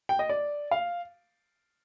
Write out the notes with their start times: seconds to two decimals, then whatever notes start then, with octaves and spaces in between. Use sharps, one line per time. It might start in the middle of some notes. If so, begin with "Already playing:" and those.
0.09 G5
0.19 D#5
0.29 D5
0.71 F5